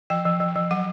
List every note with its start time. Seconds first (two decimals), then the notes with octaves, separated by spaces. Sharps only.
0.10 F3 G5
0.25 F3
0.40 F3
0.56 F3
0.71 F#3 F#5